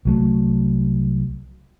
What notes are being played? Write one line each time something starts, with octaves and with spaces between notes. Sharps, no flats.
C2 F#3 A3